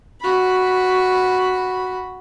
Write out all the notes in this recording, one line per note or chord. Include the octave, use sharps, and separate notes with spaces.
F#4 B5